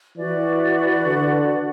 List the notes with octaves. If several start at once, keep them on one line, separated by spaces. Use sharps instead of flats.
E3 F#4 B4 D5
D3